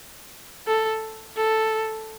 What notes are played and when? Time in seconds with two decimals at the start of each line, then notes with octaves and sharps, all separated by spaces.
0.67 A4
1.37 A4